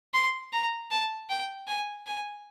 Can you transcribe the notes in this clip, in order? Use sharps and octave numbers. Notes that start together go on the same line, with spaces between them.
C6
A#5
A5
G5
G#5
G#5